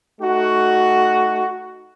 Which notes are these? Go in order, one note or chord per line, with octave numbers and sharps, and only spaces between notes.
A3 D#4 F#4